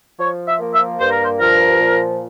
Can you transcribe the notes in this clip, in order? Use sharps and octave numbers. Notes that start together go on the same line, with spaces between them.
F3 C#5
E5
A#3
E5
G2 C5
A#4
C5
F3 A#4
A#2